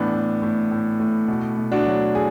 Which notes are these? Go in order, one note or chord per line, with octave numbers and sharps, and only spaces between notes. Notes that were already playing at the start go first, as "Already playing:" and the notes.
Already playing: A2 E3 B3 D4
A2
A2
A2
A2
B2
B2
D4 F#4
F#3
G#4